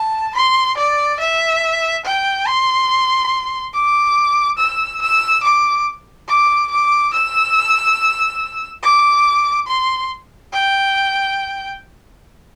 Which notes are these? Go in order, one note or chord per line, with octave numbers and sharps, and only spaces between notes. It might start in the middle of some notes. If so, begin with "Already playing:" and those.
Already playing: A5
C6
D5
E5
G5
C6
D6
E6
E6
D6
D6
D6
E6
D6
C6
G5